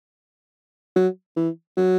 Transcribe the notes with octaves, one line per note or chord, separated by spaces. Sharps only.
F#3
E3
F#3